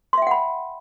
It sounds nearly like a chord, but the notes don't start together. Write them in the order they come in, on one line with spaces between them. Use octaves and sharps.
C6 E5 G5 F#5 B5